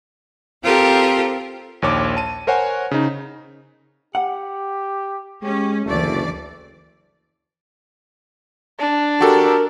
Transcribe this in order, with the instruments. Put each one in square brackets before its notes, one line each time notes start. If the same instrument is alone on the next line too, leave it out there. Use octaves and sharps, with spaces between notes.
[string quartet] C4 F4 G4 A4 A#4 C5
[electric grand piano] A#1 D#2 C#5 D6
A5 D#7
A#4 C5 C#5 F#5 G#5
C#3 D#4
[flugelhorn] G4 [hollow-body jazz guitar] F#5
[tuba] G#3 [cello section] C#4 [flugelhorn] G4
[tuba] F#1 [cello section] D2 E3 D5 [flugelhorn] A3
[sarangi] D4
[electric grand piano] F#4 G4 A4 [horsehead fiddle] A#4